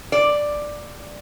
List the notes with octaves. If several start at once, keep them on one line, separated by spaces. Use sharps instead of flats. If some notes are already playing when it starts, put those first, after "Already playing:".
D5